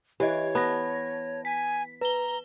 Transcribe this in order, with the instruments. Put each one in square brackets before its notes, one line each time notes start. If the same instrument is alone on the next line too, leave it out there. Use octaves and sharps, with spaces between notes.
[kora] E3 [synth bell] G4 D#5 [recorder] C#5
[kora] B3 [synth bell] A5 A#6
[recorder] G#5 [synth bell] B6
[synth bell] B4 G7 [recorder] A#5